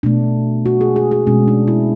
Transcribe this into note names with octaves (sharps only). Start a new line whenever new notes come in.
B2 A3 D4
F#4
G#4
G#4
G#4
B2 G#3 C#4
D4
E4